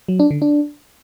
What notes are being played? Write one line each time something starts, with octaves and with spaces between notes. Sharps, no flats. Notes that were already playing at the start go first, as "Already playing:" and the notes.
F#3
D4
D3
D4